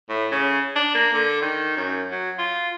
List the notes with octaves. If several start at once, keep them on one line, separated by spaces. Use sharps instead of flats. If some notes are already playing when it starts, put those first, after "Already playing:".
A2
C#3
D4
A#3
D3
D#3
F#2
F#3
F4